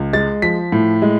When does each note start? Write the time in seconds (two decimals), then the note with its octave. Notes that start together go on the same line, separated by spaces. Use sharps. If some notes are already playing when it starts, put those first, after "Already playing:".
Already playing: C#2
0.13 G#3 A6
0.42 F3 B6
0.72 A2
1.02 G#3